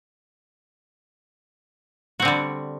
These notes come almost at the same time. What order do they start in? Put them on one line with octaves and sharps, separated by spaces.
F#4 C4 D3 G3